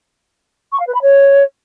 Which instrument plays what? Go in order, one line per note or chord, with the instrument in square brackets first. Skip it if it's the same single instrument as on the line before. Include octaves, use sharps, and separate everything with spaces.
[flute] C#6
F5
B4
B5
C#5